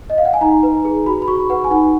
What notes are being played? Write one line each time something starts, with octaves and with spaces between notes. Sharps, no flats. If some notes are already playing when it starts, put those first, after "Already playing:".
D#5
F5
F#5
G#5
D#4 A#5
B4
G#4
F#4 B5
B5
F#4 C#6
B4 F#5
G#5
D#4 F#5